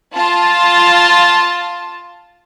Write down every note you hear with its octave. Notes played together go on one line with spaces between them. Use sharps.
F4 A5